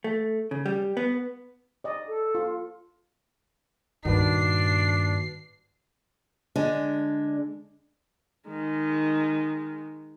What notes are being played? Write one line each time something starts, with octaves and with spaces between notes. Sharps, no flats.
A3
C#3
G3
B3
D5 D#5
A4
F4
G2 A#2 D#3 D4 F#4 B4 C7
D3 G#3 D4
D#3 G#3